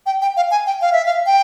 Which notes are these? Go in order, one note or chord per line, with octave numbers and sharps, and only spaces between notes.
G5
G5
F5
G#5
G5
F5
E5
F5
G5